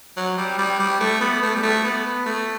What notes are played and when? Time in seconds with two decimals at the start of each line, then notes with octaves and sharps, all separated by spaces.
0.17 F#3
0.38 G3
0.58 G3
0.80 G3
1.00 A3
1.21 B3
1.42 A3
1.55 G3
1.63 A3
1.84 B3
2.26 A3